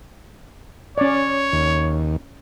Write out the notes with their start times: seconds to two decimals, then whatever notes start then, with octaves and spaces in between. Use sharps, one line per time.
0.98 C#4 C#5 D5
1.52 D#2